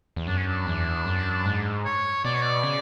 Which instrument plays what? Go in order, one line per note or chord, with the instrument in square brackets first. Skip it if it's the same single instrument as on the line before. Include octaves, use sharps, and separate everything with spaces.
[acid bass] E2
[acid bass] F#2 [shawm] D4
[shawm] C#4
D4
[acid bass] E2
F#2
G#2
[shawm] C#5
[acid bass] B2 [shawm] D5
[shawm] C#5
D5
[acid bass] C#3